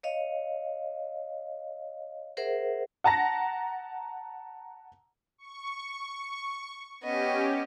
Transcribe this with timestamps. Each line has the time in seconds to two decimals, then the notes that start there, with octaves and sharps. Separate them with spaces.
0.03 C#5 D#5 F5
2.37 G#4 A#4 C5 E5 F#5
3.04 F#5 A5 A#5 A#6
5.38 C#6
7.03 B3 C#4 G4 D#5